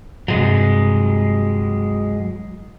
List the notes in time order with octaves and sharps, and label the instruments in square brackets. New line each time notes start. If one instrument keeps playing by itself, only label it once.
[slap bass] G2 C3 [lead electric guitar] F#3 G#3